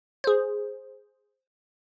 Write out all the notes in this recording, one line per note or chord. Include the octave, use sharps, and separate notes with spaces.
G#4 C5